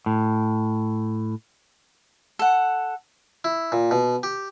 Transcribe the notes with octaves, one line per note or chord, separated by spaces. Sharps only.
A2
A4 F#5
E4
A#2
B2
G4